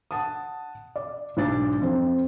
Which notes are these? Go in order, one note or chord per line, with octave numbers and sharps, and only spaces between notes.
F#5 A5 D#6
D5
B1 G#2 D4 A6
F2 C4